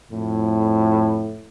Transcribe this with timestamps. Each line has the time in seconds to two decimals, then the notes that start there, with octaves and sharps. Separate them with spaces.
0.10 F2 A2